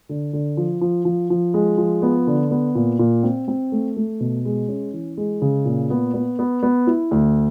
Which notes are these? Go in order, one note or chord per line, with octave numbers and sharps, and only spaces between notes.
D3
D3
F3
F3
F3
F3
G#3
F3
B3
D3
B3
A#2
A#2
C4
C4
A3
A3
B2
G#3
C#4
E3
G#3
C#3
A#2
B3
B3
B3
B3
E4
D2